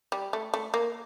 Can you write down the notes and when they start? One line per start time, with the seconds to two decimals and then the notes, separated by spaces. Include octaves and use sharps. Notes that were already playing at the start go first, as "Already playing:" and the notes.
0.12 G3
0.33 A3
0.54 A3
0.74 A#3